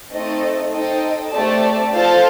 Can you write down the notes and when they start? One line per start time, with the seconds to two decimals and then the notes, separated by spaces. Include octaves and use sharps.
0.12 A3 C4 D#4 A4 D#5
0.71 D#4 A4 C5 D#5 G5
1.32 A3 C4 G4 D5 A5
1.92 F4 A4 C5 F5 A5